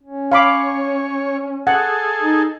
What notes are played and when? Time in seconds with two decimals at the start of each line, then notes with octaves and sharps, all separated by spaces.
0.03 C#4
0.32 C#5 F5 B5 D6
1.67 G#4 A4 F#5
2.21 D#4